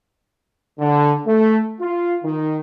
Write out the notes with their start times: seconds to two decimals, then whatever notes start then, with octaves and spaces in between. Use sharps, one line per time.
0.78 D3
1.26 A3
1.80 F4
2.23 D#3